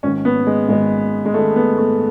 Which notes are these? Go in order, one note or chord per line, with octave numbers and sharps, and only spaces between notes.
G#1 G#2 C#4
B3
G#3
G#1 G#2 G#3
G#3
G#1 G#2 A3
B3
A3